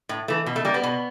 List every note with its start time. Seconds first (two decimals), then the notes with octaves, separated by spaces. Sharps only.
0.09 A2
0.28 E3 A3
0.46 B2
0.56 A3
0.65 G3 A#3
0.74 B3
0.84 B2